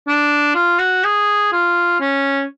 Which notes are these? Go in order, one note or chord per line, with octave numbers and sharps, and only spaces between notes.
D4
F4
F#4
G#4
F4
C#4